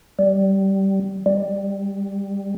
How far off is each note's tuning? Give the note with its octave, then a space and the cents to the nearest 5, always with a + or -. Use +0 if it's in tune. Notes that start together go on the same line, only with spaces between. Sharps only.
G3 -15
G3 +15